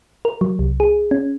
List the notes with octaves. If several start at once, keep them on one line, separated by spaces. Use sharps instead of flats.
A#4
F#3
C2
G#4
C#4